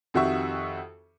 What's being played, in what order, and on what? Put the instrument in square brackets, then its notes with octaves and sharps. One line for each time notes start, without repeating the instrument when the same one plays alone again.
[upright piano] F2 D#3 F#4 G4 E5 C#6